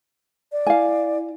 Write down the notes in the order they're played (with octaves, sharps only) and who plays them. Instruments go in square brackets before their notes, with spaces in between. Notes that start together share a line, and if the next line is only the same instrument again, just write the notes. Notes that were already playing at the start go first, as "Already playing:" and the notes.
[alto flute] D5
[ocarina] E4 [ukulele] F5 G#5